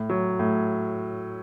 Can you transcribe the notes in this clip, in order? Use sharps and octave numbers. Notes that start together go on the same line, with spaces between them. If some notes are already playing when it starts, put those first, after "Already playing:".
Already playing: A2
F#3
A2